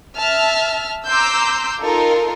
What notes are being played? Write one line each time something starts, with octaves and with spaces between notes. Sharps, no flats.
E5 A5 F6
A#5 C6 D6 E6 G6
D#4 F4 A4 A#4